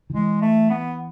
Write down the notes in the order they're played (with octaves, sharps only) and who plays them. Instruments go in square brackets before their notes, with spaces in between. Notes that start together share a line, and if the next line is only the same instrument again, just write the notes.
[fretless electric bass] D#3
[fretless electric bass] E3 [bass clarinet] G#3
[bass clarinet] A3
B3